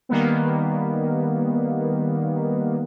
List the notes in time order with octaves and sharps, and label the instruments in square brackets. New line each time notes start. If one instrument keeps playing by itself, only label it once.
[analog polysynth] D#3 G3 A#3 B3